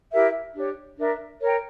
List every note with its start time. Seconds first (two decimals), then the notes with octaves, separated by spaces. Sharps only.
0.11 E4 G4 A#4 E5
0.55 D4 G4 C#5
0.96 D4 A#4 E5
1.40 A#4 C#5 G5